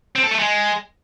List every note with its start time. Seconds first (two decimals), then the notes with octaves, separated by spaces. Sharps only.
0.16 C4
0.23 A4
0.31 A3
0.39 G#3